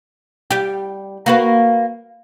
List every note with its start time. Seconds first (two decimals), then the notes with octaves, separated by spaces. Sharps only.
0.51 G3 G4
1.26 A#3 F#4 B4